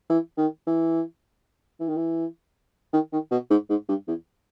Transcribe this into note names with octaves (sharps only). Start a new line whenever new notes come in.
E3
D#3
E3
E3
D#3
E3
D#3
D#3
B2
G#2
G#2
G2
E2